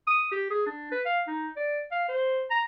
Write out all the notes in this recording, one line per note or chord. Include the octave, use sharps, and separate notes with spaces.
D#6
G4
G#4
D4
B4
F5
D#4
D5
F5
C5
A#5